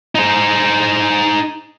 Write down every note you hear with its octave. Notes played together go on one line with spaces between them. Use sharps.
D#4 C5